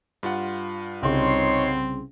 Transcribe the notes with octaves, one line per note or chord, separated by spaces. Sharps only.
G2 F4 F#5
C2 C#3 C4 D#4 C#5 C6